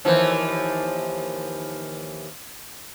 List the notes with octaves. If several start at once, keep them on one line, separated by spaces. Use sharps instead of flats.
D#2 E3 F3